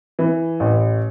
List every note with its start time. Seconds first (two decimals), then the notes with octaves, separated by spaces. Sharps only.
0.19 E3
0.60 A1